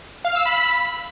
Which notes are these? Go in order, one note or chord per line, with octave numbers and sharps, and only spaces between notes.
F5
E6
B5